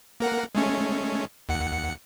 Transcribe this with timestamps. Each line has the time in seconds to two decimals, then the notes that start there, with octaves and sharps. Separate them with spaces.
0.20 A#3 A#4 F#5
0.55 G#3 A3 C#4
1.49 D#2 F#5 C#7